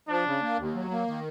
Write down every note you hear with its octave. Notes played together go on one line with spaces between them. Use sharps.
F3 D4
C#3
A#3
D#2
F#3
A#3
D#3